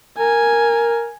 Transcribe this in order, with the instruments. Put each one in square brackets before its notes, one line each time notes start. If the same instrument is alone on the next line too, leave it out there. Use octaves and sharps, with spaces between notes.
[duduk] A#4 [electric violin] G#5